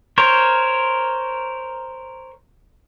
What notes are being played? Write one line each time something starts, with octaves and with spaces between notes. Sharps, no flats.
A#4 C5 C#5